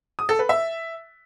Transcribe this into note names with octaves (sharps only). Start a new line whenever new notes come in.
D#6
A4
B4
E5